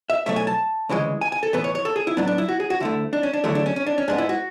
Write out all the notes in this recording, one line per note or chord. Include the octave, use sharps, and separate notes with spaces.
E5
B1 B2 F#3 A3 E5
G#5
A5
D2 C#3 E3 G#3
G#5
G#5
A4
A2 E3 B3 B4
C#5
C#5
A4
G#4
E4
A2 F#3 B3 D4
D4
E4
F#4
G#4
F#4
D2 D3 A3 E4
D4
C#4
D4
E2 D3 F#3 A3 E4
D4
C#4
C#4
D4
C#4
G#2 G#3 B3 D4
E4
F#4